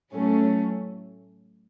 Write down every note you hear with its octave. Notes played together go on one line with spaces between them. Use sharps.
A2 F#3 A3 C#4